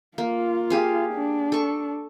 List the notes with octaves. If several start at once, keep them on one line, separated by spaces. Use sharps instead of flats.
A#3 F4
G4 G#4 F5
D4
A4 C#6